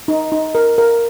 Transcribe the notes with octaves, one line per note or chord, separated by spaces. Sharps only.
D#4
D#4
A#4
A#4